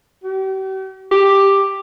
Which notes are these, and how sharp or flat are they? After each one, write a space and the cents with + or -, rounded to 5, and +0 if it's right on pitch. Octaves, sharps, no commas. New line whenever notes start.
G4 -45
G4 +5